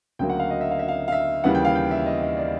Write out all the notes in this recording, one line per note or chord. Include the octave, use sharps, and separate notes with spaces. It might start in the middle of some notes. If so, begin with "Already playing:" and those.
D2 C#3 F#3 A#3 G5
F#5
F5
D#5
E5
F5
E5
F5
F5
E5
D#2 C#3 E3 G3 F#5
G5
F5
G5
E5
D#5
D#5
D5